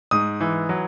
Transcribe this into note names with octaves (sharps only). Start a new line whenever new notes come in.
G#2 D#6
E3
F#3